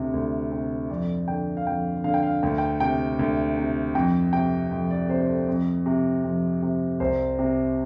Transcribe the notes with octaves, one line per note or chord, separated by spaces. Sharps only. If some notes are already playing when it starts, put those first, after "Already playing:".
Already playing: D2 C3
D2
C3
F2 D5
D3 G5
F5
F2 G5
D3 F5
G5
F5
D2 G5
G5
C3 G5
D2
C3
F2 G5
C3 G5
F2
D5
C3 C5
C5
A4
F2
C3
F2
C3
C2 C5
C3